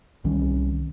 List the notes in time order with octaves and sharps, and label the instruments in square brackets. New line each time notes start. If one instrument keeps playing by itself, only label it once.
[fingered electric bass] C2 D#3 G3 C#4